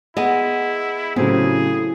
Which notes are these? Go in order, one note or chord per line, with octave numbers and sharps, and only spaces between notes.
G#3 B3 E4 D#5 F#5 G#5
A2 C#3 F#3 C4 G4 G#4